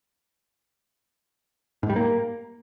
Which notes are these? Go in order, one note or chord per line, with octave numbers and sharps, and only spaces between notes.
G#2
G3
A#3